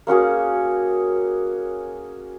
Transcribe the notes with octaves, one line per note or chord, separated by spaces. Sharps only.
A#3 C#4 F#4 G#4